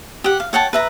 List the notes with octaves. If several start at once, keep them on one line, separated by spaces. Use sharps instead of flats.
G4 F#5
F5
C#5 F#5 G5 A5
B4 E5 A#5